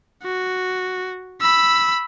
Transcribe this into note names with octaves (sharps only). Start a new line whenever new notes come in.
F#4
B5 E6